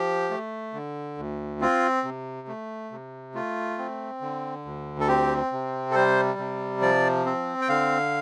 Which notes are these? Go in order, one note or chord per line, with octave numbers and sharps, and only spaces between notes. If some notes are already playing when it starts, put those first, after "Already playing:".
Already playing: F3 G4
A3
D3
D2
C4 F4
C3
A3
C3
A3 F4
C4
D3
D2
A4
C4 G4
C3
A4
G3 C5
C3
F3 D5
C4
G5
D3 F5